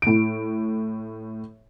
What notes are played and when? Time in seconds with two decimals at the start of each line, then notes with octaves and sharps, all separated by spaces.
0.02 A2 D7